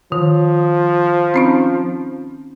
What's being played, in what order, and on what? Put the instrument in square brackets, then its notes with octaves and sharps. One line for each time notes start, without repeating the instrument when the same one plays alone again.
[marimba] D#3 [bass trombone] F3
[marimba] C4 C#4 D#4